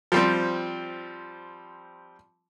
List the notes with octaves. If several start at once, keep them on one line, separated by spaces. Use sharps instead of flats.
F3 G3 C4